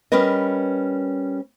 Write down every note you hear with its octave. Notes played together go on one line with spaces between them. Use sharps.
G3 C#4 A#4 B4 D#5